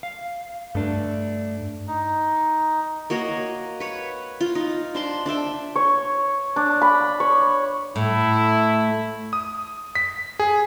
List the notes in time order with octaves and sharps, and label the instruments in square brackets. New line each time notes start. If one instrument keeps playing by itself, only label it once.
[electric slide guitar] F5
[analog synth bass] G2 [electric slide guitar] A3 D4
[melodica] D#4
[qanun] A#3 F#4 C#5 D#5
B4 C#5 F#5
F4
D#4
D4 C5 C6
D4 C5 E5 G5
[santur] C#5
D4
B5
C#5
[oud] A2 [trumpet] E4
[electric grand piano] D#6
B6
G#4